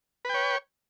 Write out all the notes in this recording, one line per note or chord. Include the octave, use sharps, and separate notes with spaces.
B4 C#5 G5